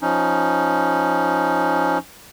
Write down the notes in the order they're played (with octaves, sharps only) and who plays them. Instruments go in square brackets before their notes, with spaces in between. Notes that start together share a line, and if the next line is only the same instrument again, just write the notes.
[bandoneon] F3 C#4 D#4